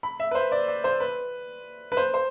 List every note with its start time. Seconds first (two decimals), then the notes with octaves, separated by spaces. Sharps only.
0.03 B5
0.20 E5
0.31 B4
0.35 C5
0.52 D5
0.68 D5
0.84 C5
1.00 B4
1.92 B4
1.97 C5
2.14 C5